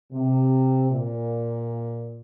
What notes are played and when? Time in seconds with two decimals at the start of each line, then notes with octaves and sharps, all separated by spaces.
0.12 C3
0.90 A#2